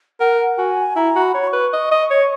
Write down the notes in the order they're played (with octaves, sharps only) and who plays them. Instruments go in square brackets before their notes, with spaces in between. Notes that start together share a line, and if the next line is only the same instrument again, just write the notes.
[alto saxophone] A#4 [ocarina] F#5
[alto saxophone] F#4 [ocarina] G#5
[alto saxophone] E4 [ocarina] A#5
[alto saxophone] F#4
[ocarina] B5
[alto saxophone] C#5
[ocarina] B5
C#6
[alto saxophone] B4
D#5
D#5
C#5